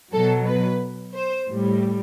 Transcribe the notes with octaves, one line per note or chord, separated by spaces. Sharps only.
B2 F#3 A4
B4
C5
A2 G3